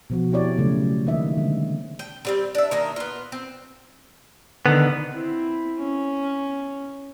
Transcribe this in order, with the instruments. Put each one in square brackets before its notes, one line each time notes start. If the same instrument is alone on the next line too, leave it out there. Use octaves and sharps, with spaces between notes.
[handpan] B2 F3 F#4
C4 E4 G4 C#5 D5
C#3 F#3 A3
D#3 A#3 D#5 E5
D3 G#3 C4
[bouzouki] G5
D3 G3 C4
D4 E5
D#3 A#3 D4
B3 F4
C4
[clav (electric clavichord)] D3 D#3 [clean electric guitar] B3
[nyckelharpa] C4 E4
C#4